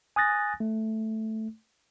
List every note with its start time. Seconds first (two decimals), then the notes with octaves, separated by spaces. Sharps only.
0.16 G#5 D#6 F#6 A6 A#6
0.60 A3